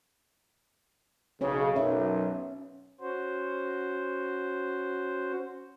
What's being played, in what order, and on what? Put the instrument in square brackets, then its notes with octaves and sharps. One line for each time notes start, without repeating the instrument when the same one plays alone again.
[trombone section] B1 C#3 [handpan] C#4 C#5
[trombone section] B1 F#2 [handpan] C#4 E5
[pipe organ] C#4 F#4 C5